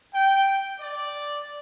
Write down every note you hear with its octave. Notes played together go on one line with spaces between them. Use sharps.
G5
D5